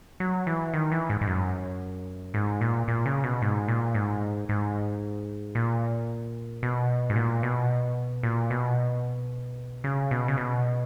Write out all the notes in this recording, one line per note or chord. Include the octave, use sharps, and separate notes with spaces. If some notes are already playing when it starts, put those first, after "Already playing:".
F#3
E3
D#3
E3
G#2
G#2
F#2
G#2
A#2
A#2
C#3
B2
G#2
A#2
G#2
G#2
A#2
B2
G#2
A#2
B2
A#2
B2
C#3
B2
C#3
B2